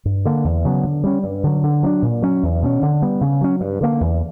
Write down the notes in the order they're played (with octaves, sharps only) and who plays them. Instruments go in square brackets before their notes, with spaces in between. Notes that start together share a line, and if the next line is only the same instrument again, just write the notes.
[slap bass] G2
D3 A#3
E2
C#3 F#3 B3
D3
G3 C#4
G2
D3 F#3
D3
F#3 B3 D4
A#2
F#3 C#4
E2
B2 A#3 C#4
D3
G3 B3
C#3
F#3 C#4
G2
D3 A#3
E2